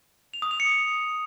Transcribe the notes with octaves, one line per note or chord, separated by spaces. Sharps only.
F7
D#6
F7
C#7